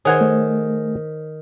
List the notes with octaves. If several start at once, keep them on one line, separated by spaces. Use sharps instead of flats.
D#3 G#4 C5 C#5 F#5 G#5
A3